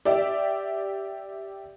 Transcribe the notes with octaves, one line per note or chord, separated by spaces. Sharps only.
G4 D5 E5